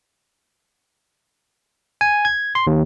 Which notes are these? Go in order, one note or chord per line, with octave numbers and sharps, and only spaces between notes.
G#5
G#6
C6
D#2